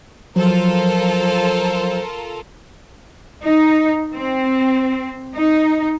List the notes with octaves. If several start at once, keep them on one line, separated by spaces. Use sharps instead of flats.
F3 F#3 F4 A4 A#4 C5
D#4
C4
D#4